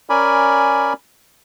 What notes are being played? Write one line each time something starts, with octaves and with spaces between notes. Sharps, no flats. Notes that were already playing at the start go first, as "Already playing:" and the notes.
C#4 A#4 D5 G#5 B5